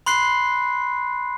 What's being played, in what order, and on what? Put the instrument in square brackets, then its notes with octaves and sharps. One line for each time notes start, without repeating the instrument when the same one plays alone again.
[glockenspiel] B5 C6 F#6 C7